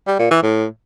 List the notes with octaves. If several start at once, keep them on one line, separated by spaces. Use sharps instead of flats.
G3
A#2
E3
A2